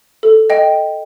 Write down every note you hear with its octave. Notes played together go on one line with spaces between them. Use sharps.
A4
D#5 G5